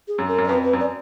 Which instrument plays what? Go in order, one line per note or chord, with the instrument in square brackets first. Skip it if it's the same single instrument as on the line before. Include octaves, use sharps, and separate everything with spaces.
[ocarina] G#4
[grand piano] F#2
[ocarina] A#4
[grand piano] F#2
[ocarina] D5
[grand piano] F2 [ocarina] B4
[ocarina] B4
[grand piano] F#2
[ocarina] D5